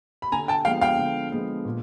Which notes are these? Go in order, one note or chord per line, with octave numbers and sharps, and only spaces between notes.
B5
D3 G#5 A#5
G5 A5
F3 G#3 B3 F5 G5
F5 G5
D3
F3 G#3 B3
A#2